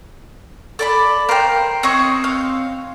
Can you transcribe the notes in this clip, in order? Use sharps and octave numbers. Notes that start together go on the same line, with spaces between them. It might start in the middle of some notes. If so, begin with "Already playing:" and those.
A4 D5 B5
A#4 C5 F5 G5
C4 C5 C#5 D#5 C#6
C#5 F5